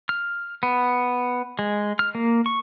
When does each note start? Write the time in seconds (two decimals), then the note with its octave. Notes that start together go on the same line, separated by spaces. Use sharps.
0.09 F6
0.63 B3
1.59 G#3
1.99 F6
2.15 A#3
2.46 C#6